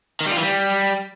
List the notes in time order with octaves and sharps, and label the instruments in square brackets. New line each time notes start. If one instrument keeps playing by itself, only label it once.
[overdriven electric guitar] D#3
G3
F4
E3
G3